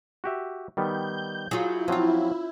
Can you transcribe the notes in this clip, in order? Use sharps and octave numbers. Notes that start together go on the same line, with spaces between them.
F#4 G4 E5
D#3 G3 B3 G6
F#3 E4 F4 G#4
F3 F#3 C4 C#4 F4